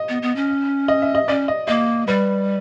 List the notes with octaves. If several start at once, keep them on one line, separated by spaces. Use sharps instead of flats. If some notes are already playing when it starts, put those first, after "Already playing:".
Already playing: D#5
B3
B3
C#4
D#5
E5
D#5
C#4 D5
D#5
A#3 D#5
G3 B4